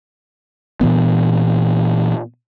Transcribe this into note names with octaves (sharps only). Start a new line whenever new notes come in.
A#2 E3 B3